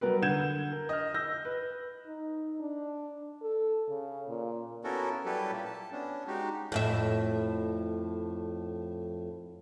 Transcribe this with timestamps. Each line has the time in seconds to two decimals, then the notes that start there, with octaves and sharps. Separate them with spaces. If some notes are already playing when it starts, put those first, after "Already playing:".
0.01 F#3 G3 B3 A#4 B4
0.22 D3 F#5 G6 G#6 E7
0.72 A#4
0.89 D#5 F6
1.14 E6 G6 A#6
1.45 B4
2.07 D#4
2.60 D4
3.42 A4
3.89 C#3
4.28 A#2
4.84 B3 C#4 E4 F#4 A4 A#4
5.26 F#3 G3 E4 G4 A4 B4
5.52 A#2 A#3
5.65 A5
5.92 B3 C#4 D4
6.27 G#3 D#4 F#4 G4
6.72 F2 A2 E5